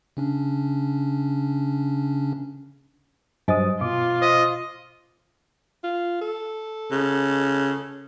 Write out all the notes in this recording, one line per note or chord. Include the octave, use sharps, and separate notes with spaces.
C#3 C#4 D4
G2 F#3 C5 D#5 G#5 D#6
B2 F4 D6
C5 D#5 F5
F4
A4
C#3